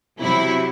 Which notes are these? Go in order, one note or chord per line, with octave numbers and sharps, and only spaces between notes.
C3 F#3 E4